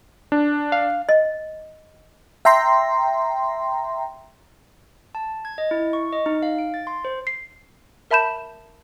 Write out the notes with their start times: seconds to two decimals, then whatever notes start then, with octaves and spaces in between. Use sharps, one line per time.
0.32 D4
0.72 F5
1.09 D#5
2.45 E5 G5 A#5 C6
5.15 A5
5.45 G#6
5.58 D#5
5.71 E4
5.93 C#6
6.13 D#5
6.26 D#4
6.43 F5
6.58 D7
6.74 A6
6.87 C6
7.05 C5
7.27 C7
8.11 A#4 E5 A5 B5 G6 E7